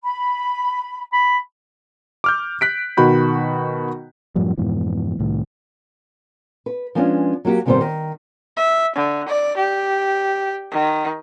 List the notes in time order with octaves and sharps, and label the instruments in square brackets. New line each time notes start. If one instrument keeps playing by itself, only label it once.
[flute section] B5
[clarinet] B5
[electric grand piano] D6 F6 G6
F#6 B6 D7
B2 D#3 F#4 B5 G6
[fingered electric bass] F#2 A2 F3 G3
F2 G#2 B2 E3
C2 A2 D#3
[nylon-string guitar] B4
F3 G#3 B3 C#4 D4
F#3 A#3 F#4 G4
G#2 C3 D#3 G3 B3 C5
D#3
[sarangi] E5
D3
D5
G4
D#3